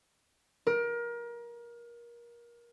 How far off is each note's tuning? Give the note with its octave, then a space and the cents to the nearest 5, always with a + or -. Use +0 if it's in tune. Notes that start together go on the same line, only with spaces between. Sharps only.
A#4 +25